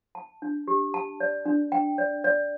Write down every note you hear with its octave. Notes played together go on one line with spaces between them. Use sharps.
A5
D4
G4
A5
D5
D4
G5
D5
D5